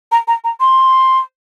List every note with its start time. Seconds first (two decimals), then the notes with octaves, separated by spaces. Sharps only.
0.12 A#5
0.28 A#5
0.44 A#5
0.60 C6